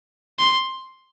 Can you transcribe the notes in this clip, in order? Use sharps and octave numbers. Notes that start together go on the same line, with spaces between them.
C6